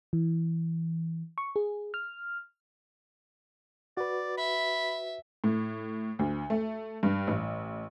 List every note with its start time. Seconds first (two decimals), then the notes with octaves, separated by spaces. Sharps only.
0.13 E3
1.38 C#6
1.56 G#4
1.94 F6
3.97 F#4 B4 D5
4.38 E5 B5
5.44 A2
6.19 D2
6.50 A3
7.03 G2
7.27 A1